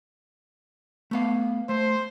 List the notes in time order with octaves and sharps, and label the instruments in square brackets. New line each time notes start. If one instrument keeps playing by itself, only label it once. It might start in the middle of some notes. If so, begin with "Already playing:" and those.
[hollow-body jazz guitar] A3 B3 F5
[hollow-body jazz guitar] A3 [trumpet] C5